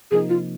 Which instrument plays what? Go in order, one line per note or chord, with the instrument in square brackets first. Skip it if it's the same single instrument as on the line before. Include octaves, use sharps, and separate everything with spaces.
[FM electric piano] C3 F3 A#3 D#4 [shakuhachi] G#4
[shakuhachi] F4